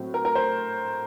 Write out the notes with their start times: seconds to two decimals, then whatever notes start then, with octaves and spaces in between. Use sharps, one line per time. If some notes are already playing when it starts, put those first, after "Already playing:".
Already playing: A2 F#3 C4
0.14 A#4
0.25 A#4
0.35 C5